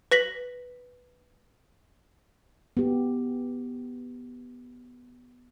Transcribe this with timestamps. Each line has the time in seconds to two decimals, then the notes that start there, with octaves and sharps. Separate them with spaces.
0.11 B4 A#6 B6 F#7
2.77 B3 G4